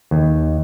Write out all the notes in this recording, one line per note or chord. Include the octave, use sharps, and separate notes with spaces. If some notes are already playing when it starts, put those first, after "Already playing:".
D#2